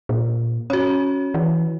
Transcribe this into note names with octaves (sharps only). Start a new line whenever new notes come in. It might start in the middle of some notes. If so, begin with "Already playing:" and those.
A#2
C#4 F#4 C#5
E3